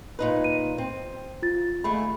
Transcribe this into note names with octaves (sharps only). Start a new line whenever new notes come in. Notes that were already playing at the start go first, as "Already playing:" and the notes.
A#2 D#4 B4
D#7
C4
F4 A6
D#2 A3 G#4 B5